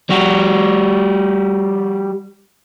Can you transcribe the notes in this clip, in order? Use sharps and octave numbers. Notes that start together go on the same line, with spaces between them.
G3 F#4